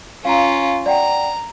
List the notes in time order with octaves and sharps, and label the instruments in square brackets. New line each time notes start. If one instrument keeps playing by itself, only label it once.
[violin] C#4 F4 [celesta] F5 A#5
[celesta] D5 F#5 G5 [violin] A#5